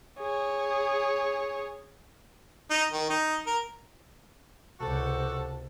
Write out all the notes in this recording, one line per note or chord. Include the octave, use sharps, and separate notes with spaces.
G#4 C#5
D#4
D#3
D#4
A#4
C#2 C3 F#4 A4